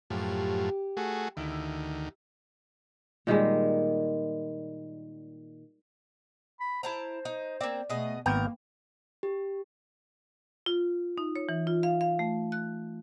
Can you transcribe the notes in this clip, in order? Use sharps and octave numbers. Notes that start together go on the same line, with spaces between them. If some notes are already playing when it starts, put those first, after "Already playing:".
F#2 A2 F3 G4
A3 F#4 G#4
D2 D#3 E4
A#2 D#3 G3 G#3
B5
E4 C5 A5 A#5
D#4
A#3 C4 D5
B2 A3 G#4 D#5
G#1 A#3 B3 A#4 G5
G4
F4
D#4
C#5
E3
F4
F5
F5
A3
F#6